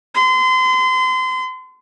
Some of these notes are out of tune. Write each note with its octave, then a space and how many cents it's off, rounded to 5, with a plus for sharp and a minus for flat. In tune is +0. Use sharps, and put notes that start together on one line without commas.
C6 -30